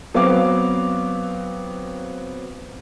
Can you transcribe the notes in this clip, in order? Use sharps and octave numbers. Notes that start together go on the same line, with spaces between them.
F#3 B3 C4 F5 D6